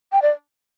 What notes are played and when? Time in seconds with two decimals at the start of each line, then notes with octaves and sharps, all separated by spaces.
0.12 G5
0.22 D5